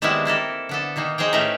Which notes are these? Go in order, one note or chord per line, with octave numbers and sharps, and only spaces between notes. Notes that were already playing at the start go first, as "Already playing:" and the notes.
D#3 G3 G#3 B3 C4 E4
A#3 E4 A4 A#4
D3 B3 A4
B2 D#3 A#3 D#4
D#4 G#4 C5 C#5 G5
A2 A3 C#4 A#4 B4 A#5